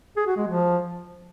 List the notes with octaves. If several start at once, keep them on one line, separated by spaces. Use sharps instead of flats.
G#4
F#4
G#3
F3